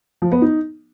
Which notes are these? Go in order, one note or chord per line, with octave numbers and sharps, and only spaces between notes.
F3
B3
D#4